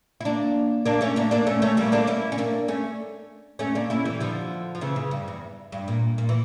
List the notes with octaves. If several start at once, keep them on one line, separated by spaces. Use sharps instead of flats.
E4
A#3 D4
A#3 D4
A3 C#4
A#3 D4
A#3 D4
A3 C#4
A3 C#4
G3 A#3
A#3 D4
C#4 E4
C#4
A#3 D4
A3 C#4
A3 C#4
A#3 D4
C#4 E4
E3 G3
D3 F3
F3
C#3 E3
C#3
G2
E2
G2
A#2
A#2
E3